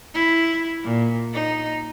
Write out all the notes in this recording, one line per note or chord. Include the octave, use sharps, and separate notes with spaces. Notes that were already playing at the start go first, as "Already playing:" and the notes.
E4
A#2
D#4